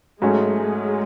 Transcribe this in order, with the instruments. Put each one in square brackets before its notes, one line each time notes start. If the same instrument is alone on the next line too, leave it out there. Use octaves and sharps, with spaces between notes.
[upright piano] G#2 F#3 A3 C#4 [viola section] G#3
[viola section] G#3